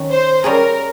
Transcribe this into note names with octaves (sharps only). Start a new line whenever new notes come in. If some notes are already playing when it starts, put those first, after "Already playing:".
Already playing: D#3 C#4
C5
G3 C#4 F4 G#4 A#4